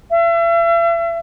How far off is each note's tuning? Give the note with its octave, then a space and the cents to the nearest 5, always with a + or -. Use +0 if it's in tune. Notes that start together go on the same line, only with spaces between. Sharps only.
E5 +40